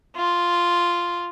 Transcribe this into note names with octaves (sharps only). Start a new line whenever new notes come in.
F4